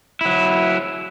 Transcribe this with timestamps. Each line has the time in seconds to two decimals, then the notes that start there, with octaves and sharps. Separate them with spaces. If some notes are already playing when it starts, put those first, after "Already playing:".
0.21 F#3 E4